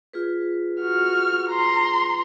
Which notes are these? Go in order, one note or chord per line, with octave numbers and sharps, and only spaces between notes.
F4 G#4 B4
F#4 F6
A#5 C6